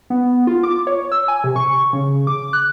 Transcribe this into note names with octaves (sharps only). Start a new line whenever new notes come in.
B3
F4
D6
C#5
E6
G#5
C3
C#6
C#3
D6
F#6